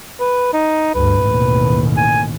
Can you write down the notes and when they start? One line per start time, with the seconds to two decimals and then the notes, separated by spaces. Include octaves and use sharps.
0.20 B4
0.53 D#4
0.95 D2 G2 B4
1.25 A1 D#2 B2
1.97 G#5